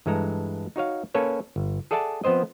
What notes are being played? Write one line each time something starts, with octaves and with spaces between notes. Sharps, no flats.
G2 E3 G#3 A4 A#5
D#4 F#4 C#5 F5
A#3 C#4 A4 B4 C#5
G1
G#4 A4 D5 E5 F#5 A5
F3 B3 C4 C5 D#5